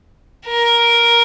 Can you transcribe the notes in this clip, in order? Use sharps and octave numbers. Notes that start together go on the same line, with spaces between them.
A#4